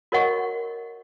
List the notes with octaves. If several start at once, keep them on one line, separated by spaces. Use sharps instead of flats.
F#4 A#4 C#5 D#5 F#5 C#6